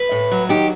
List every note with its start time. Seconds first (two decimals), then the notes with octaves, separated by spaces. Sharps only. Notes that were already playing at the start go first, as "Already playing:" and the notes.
Already playing: B4
0.11 A2
0.32 F#3
0.49 D#3 G4